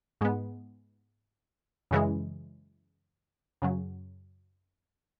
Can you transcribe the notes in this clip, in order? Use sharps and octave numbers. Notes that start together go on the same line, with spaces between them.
G#2 G#3 B3
F#2 C#3 E3 G#3
F#2 C#3 F#3